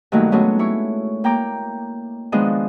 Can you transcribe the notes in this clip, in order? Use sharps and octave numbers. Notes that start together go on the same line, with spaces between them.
G2 D#3 F#3 A3 A#3
F#3 G#3 A3 B3 C#4
E4 C#5 C#6
A#3 G5 A#5 D6
D#3 F3 G#3 B3 D4 D#5